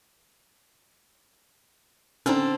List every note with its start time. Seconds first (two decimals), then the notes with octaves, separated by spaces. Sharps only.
2.26 D3 C4 C#4 D#4 A4